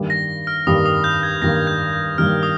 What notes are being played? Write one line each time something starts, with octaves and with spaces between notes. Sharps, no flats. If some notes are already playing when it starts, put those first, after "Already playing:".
Already playing: G2 D#3 G3 A#3
A#6
F6
G2 D#3 G3 A#3 D#6
D#6
G6
G#6
G2 D#3 G3 A#3 A#6
G6
G6
G2 D#3 G3 A#3 F6
D#6